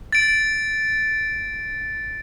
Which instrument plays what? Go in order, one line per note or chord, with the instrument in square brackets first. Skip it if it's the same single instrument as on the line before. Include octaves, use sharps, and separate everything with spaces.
[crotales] A6 D7